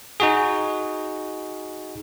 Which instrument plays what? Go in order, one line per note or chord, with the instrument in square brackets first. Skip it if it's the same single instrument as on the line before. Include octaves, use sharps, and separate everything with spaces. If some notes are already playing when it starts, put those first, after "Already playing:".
[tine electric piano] D#4 F#4 G#4